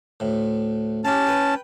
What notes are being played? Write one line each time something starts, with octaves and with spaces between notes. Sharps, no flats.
D2 A2
C#4 G4 F5 A5
B4 G5